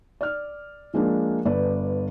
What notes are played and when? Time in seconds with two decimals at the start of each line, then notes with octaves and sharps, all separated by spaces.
0.21 D5 F6
0.94 F3 G#3 A#3 D4
1.45 G1 B4 D5